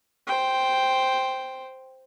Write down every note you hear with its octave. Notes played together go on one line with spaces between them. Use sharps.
C5 G5